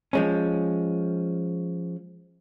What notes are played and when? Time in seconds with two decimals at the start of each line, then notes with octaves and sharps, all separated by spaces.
0.13 F3 G#3 C#4